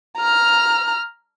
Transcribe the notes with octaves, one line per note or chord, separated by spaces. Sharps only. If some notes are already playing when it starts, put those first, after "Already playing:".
A#5 F6